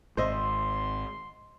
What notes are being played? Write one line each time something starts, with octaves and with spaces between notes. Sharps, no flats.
G#1 C5 D#5 E5 C6